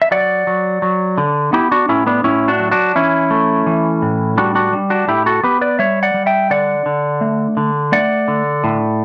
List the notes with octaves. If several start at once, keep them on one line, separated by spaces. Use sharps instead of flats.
E5
F#3 D5 F#5
F#3
F#3
D3
B3 E4 G4
D4 F#4
A2 C#4 E4
B3 D4
A2 C#4 E4
D4 F#4
F#3
D4 F#4
E3 C#4 E4
A3
E3
A2
G3 D4 F#4
D4 F#4
G3
D4 F#4
A2 E4 G4
F#4 A4
B3 G4 B4
B4 D5
G3 C#5 E5
D5 F#5
G3
E5 G5
D3 D5 F#5
D3
A3
D3
A3 D5 F#5
D3
A2